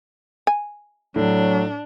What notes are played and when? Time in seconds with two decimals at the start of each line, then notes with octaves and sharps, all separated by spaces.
0.47 G#5
1.16 A2 F#3 D4